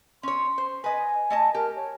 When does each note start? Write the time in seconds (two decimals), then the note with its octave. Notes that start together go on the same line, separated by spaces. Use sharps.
0.23 C#4 C#5 C6
0.58 C5
0.84 B4 D#5 G#5
1.30 A3 D#5 A5
1.54 G4 A#4
1.76 C#5